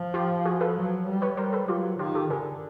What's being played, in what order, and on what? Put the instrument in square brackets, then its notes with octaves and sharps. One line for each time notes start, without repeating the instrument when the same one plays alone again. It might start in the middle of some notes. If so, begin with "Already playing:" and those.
Already playing: [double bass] F3
[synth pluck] F4 G4
F#4 G#4
A4 B4
[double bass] F#3
G3
[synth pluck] B4 C#5
[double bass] G3 [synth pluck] A#4 C5
[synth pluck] A4 B4
[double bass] F#3 [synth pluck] F4 G4
[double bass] D#3 [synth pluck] F4 G4
[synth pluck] G4 A4
[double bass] D3 [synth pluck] G#4 A#4